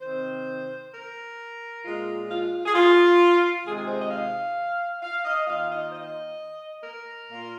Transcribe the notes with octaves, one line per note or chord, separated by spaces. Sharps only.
C3 D#3 C4 C5
A#4
A#2 G#3 F4
F4
G#4
F4
C3 D#3 G#3 F4 G#4
G#4
C5
D#5
F5
F5
D#5
D#3 A#3 F4 F5
D#5
C5
D#5
A#4
A#2 A#3 F4